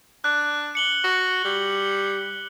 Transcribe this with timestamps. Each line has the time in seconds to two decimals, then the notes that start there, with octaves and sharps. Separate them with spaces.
0.24 D4 F#6
0.75 C#7 F#7 G7
1.04 F#4
1.45 G3